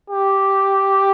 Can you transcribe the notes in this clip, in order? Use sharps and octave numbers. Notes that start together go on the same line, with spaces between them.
G4